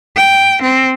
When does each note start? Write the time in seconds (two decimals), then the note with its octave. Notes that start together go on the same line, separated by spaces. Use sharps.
0.16 G5
0.62 C4